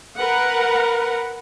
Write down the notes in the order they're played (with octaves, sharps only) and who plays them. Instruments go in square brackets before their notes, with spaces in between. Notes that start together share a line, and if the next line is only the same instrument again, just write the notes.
[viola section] A#4 B4 F#5